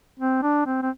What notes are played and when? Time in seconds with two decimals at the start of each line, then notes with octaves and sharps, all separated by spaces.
0.19 C4
0.42 D4
0.66 C4
0.82 C4